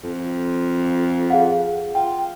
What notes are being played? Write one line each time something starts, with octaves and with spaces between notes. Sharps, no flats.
F2
G#4 F5 F#5
F4 G5